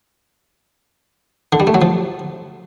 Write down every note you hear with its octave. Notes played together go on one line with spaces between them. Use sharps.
D3
G3
A3
F#3
F3